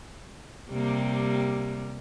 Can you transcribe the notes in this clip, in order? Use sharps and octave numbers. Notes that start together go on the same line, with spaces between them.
C3 G3 A#3